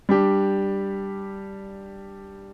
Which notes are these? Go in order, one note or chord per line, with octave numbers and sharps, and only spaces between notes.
G3 D4 G4